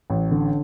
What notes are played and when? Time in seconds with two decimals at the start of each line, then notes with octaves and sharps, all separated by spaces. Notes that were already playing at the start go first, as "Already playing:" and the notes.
0.10 A1
0.31 D3